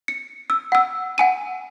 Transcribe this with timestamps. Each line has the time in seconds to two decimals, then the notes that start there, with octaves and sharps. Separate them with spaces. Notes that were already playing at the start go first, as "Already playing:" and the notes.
0.08 C#7
0.50 E6
0.72 F#5 E6
1.18 F#5 G#5 D#7